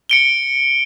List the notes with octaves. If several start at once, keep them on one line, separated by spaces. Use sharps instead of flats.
C#7 D7 G7